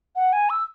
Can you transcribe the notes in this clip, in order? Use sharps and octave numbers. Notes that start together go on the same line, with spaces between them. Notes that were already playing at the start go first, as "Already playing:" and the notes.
F#5
G#5
E6